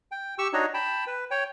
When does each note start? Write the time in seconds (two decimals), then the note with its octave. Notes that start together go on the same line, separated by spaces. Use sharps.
0.12 G5
0.38 G4 C#6 E6
0.53 D4 D#4 F#4 C#5 D#5
0.74 G5 A5 B5
1.07 B4
1.31 C#5 G5